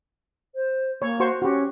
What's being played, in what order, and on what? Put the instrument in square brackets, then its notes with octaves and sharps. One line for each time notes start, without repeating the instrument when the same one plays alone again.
[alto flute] C5
[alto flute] A#3 [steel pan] C#5
[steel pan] F#4 C5 C#6
[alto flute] C#4 [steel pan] F#4 G4